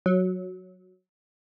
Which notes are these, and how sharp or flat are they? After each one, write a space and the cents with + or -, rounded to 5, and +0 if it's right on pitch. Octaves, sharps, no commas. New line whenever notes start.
F#3 -10